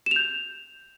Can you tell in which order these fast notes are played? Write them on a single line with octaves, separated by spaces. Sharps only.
E7 F7 G6